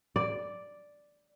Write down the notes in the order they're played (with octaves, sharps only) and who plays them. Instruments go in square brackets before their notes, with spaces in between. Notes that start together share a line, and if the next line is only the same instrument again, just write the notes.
[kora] D5